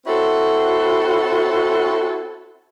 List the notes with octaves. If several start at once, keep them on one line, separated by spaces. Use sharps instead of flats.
C4 C#4 E4 F#4 A4